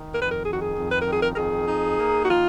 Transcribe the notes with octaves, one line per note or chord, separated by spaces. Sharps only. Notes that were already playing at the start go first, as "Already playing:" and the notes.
Already playing: D#3
F2 A#4
B4
A#4
D#3 G#4
F#4
G#4
F2
B4
A#4
D#3
G#4
A#4
A#4
F2 G#4
D#4
A#3
F#4
D#3 F4